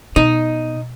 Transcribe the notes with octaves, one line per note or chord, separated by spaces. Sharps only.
B2 D#4